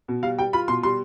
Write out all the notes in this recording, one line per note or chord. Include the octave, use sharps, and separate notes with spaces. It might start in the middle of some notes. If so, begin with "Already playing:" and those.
B2
G3 F5
G3 G5
F4 B5
B2 C6
G3 C6